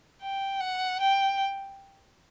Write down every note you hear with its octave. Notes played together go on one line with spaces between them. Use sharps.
G5
F#5
G5